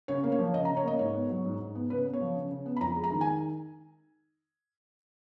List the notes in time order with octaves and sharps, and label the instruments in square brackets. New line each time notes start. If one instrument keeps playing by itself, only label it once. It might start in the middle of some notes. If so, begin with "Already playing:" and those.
[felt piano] C#3 C#5
A#3
C#5
F3
C#3 D#5
A#5
C#3
C#5
A#3 D#5
G#2 C#5
B3
F#3
G#2
G#2
B3
C#3 B4
B3
C#5
F3
C#3
C#3
B3
B5
F2 A#5
G#3
A#5
D#3
G#5